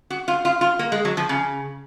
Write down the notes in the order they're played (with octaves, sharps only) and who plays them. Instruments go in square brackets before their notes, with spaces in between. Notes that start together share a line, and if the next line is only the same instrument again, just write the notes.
[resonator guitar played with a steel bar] F#4
F4
F4
F4
A#3
G#3
F#3
F3
C#3